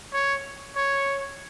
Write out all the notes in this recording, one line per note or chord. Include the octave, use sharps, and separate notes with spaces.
C#5
C#5